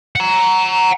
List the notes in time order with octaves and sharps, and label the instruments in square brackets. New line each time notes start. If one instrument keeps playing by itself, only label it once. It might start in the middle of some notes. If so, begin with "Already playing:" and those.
[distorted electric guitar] F#5 A#5